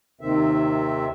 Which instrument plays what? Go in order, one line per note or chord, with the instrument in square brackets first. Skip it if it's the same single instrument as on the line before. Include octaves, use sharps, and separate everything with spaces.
[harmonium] D#2 C3 D#3 C4 E5